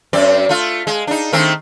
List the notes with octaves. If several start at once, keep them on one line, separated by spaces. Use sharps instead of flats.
F#2 C4 D5
A3 F4
G#3
D4 D#4
D#3 A3 C4